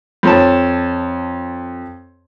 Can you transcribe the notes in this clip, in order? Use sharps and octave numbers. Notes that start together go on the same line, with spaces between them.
F2 C#5 A5